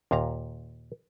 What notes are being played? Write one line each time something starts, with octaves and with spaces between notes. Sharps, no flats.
D#2 A#2 F5 A#5